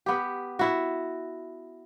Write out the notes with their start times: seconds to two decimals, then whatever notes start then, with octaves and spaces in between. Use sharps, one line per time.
0.06 B3 G4
0.59 E4 F#4